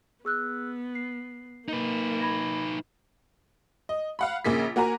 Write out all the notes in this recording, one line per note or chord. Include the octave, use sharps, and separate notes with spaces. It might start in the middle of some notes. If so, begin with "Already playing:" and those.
B3 G#4 E6 F#6
C7
A#3 D#4 B4
B5 G#6 A#6
D#5
F5 F#5 B5
A#1 C#3 A#3 G#4 B6
A#3 F#4 A#4 G#5 A#5